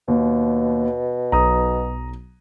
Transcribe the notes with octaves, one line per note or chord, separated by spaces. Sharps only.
D#2 B2
B1 A#5 D#6